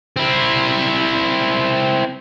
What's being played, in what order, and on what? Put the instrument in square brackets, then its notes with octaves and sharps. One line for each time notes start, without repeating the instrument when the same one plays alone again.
[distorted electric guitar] C4 E4